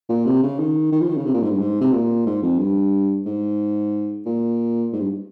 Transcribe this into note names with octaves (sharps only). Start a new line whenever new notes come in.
A#2
C3
C#3
D#3
D#3
F3
D#3
C#3
C3
A#2
G#2
G2
G#2
C3
A#2
G#2
F2
G2
G#2
A#2
G#2
G2